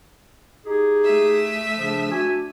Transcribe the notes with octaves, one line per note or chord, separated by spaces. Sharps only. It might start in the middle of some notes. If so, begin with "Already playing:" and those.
D#4 G4 G#4
A3 E5 D#6
C#3 F3 D4
D4 F#4 G#5